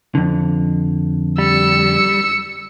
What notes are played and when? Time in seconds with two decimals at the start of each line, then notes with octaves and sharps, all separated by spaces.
0.15 F2 D3
1.38 G3 E6 C#7